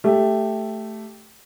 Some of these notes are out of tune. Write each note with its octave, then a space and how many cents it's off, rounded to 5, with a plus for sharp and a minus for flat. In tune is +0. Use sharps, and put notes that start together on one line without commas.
A3 +0 G4 +0